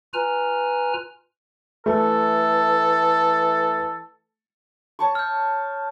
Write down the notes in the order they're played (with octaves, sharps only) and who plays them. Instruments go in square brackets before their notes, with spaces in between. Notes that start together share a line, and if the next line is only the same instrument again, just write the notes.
[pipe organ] F4 B4 G#5 A#5 F6
[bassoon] E3 [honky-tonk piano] A3 [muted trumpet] A4
[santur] C#5 A5 C#6
[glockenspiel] F6 G6